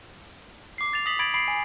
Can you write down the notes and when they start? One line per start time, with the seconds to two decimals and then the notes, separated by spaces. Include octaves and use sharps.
0.78 D6 C7
0.93 A6 F7
1.06 D#6 A#6 B6 F#7
1.19 B5 G#6 A6 D7 F#7
1.34 B5 C7 D7 F#7
1.48 G#5